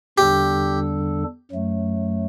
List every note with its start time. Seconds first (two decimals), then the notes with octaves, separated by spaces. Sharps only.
0.18 E2 D3 G3 D4 G4 A4
1.51 F#2 F#3 A3